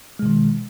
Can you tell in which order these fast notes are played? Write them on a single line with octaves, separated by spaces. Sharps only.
G#3 B2 D#3